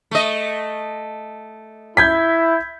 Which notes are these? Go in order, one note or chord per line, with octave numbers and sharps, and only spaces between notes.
A3 D#5
E4 G6 G#6 B6